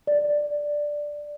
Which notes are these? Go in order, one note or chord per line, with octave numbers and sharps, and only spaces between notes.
D5